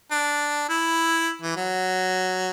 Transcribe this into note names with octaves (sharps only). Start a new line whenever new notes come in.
D4
E4
E3
F#3